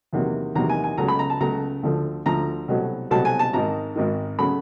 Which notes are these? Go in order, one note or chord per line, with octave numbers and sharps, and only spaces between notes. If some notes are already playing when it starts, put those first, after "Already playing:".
E2 C3 D#3 F#3 A#3
E2 C3 D#3 F#3 A#3 A#5
G#5
G#5
C#2 C#3 F#3 A3 A#5
B5
A#5
A5
C#2 C#3 F#3 A3 A#5
D2 D3 F3 A3
D2 D3 F3 A3 A#5
C2 B2 F#3 A3
C2 B2 F#3 A3 A5
G#5
A5
G#1 G#2 D#3 A#5
G#1 G#2 D#3
C#3 F#3 A3 B5